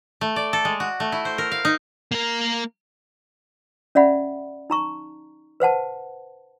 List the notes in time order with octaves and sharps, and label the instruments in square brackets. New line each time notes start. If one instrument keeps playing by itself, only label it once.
[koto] A3
D5
A4
G#3
F#4
A3
E4
C5
A#4
F5
D#4
[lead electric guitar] A#3 A#4
[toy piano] C#4 D5 E5 F#5 B5
D#4 A#5 C#6
B4 C5 F#5 A5